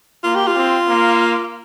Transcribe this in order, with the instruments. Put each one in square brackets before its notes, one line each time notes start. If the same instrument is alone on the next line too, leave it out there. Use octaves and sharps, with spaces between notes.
[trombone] A#3 [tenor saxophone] F4
[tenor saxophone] G4
F4
[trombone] C4
A#3